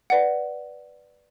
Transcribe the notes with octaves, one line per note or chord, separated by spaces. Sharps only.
B4 D5 F#5